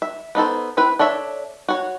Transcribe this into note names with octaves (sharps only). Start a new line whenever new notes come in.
E5
B3 D#4 A4 C5
C4 E4 B4
D4 A4 C#5 E5
F#4 C#5